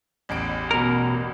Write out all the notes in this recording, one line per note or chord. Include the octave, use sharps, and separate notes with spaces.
A1 E2 D7
B2 A#4